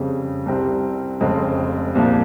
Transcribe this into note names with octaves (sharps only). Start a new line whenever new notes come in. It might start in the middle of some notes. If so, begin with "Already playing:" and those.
Already playing: F2 C#3 G3
C2 C3 G3 C4
F1 F2 C#3 G#3 C4
C2 A#2 F3